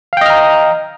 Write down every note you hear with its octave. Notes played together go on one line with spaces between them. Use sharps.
D#5 F5 G5 A#5 F6